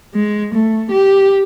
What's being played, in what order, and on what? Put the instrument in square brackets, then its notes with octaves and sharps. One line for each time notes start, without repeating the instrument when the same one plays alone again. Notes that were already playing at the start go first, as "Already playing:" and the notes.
[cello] G#3
A3
G4